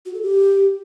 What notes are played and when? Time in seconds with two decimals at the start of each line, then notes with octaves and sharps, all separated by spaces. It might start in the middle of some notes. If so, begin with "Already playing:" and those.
0.06 F#4
0.14 A4
0.22 G4